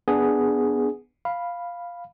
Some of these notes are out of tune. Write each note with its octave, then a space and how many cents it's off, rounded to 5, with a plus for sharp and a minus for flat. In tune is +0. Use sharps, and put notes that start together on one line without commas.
B3 +0 D4 +0 G#4 +0
F5 +0 B5 -5